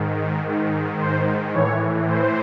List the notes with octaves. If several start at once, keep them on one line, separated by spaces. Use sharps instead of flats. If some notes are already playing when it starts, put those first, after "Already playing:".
Already playing: G#2 D#3
G#2 D#3
C5
A2 E3 C#5
C5